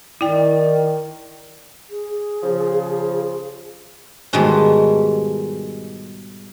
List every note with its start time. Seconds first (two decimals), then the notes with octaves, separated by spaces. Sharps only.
0.21 D#3 E4 D5 G5
1.90 G#4
2.43 C#3 F3
4.33 G#2 B2 D#3 G3 G#3 A5